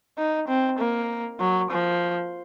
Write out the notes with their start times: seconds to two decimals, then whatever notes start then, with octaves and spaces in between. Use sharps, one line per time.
0.18 D#4
0.48 C4
0.78 A#3
1.40 F#3
1.71 F3